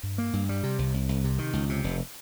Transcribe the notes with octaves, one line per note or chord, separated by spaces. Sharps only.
G2
A#3
G2
G3
C3
C2
C2
C2
C3
D#3
C#2
C3
F1